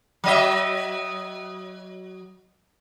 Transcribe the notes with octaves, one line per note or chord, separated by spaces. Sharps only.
F#3 D#5 E5